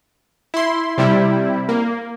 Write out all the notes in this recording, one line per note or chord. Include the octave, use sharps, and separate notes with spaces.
E4 C6
C3 G3 E4
A#3